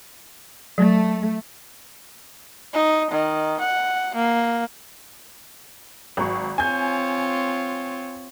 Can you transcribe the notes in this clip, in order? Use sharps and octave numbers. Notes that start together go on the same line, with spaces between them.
F#3 A3
D#4
D#3
F#5
A#3
G#1 F#3 C#6
C4 F4 C#5 G#5 G6